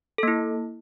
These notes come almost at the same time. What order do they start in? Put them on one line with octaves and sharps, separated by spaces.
A4 A#3 E4